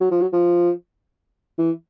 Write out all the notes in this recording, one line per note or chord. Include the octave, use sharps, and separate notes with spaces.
F#3
F3
F#3
F3
E3